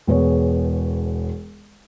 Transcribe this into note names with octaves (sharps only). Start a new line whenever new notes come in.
E1 B3 G#4 C#5